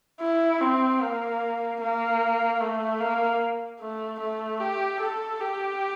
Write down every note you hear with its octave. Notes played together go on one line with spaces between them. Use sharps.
E4
C4
A#3
A#3
A3
A#3
A3
A3
G4
A4
G4